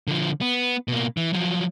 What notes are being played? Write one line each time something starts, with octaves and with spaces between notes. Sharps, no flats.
D3 F3
B3
B2 A#3
E3
F3 F#3